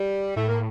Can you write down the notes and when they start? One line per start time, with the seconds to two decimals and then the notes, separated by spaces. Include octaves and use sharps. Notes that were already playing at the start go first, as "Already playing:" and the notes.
Already playing: G3
0.36 A2 A3
0.48 A#3